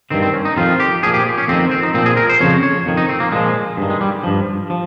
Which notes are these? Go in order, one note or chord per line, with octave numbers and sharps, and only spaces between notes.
G2 D#3 C4
C4
C#4
D#4
F2 D#3 F4
G4
A#2 F3 G#4
G4
C#4
F2 D#3 C4
C4
D#4
A#2 F3 C4
G#4
A#4
C5
F2 C#3 F3 C#5
C#5
F2 D#3
D#4
C4
A#3
A#2 F3 G#3
G2 D#3
G#3
G3
G2 F3
F3